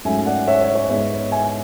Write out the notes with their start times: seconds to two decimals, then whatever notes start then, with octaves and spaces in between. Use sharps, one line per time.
0.05 G#2 F#3 A3 C#4 E5 G#5
0.26 D5 F#5
0.47 C#5 E5
0.61 C#5
0.75 C#5
0.89 G#2 G#3 B3 C#5 E5
1.32 E5 G#5